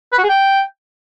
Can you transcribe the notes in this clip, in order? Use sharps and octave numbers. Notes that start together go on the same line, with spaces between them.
B4
F#4
G#4
G5